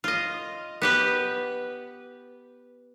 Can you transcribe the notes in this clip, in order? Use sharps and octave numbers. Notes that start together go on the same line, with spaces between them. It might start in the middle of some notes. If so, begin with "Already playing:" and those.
F4 D#5
B3 G4 B4